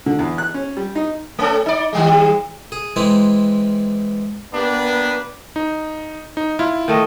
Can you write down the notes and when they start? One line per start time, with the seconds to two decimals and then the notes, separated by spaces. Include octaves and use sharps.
0.06 D3
0.19 E2
0.38 F#6
0.54 C#4
0.77 G3
0.95 D#4
1.39 A3 C#4 A4
1.66 D#4 D5
1.93 D#3 G3 G#3
2.72 G#4
2.96 E3 G#3 C4 E4
4.53 A#3 B3 D4 G4 B4
5.56 D#4
6.37 D#4
6.59 E4 F4
6.88 D#3 A3 D#5